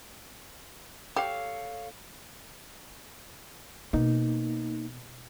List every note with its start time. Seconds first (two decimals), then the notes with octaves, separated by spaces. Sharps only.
1.16 G4 A4 C#5 F5
3.93 B2 A#3 D#4